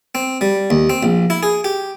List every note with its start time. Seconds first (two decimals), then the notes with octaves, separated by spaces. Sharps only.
0.15 C4
0.41 G3
0.70 D#2
0.90 C4
1.03 A#1
1.30 E4
1.43 G#4
1.64 G4